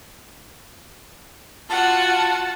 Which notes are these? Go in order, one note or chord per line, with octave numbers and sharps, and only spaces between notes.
F4 F#4 F#5 A5